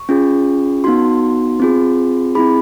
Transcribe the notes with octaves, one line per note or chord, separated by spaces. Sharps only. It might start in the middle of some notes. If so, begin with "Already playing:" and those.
Already playing: C#6
C#4 F4 G#4
B3 D#4 F#4 C6
C4 F4 G#4
C4 E4 G#4 B5